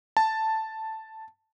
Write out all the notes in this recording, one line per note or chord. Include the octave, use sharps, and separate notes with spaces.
A5